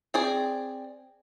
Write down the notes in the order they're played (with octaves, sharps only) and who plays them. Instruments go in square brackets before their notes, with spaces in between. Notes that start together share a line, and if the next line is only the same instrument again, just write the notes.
[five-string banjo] C4 G#4 D5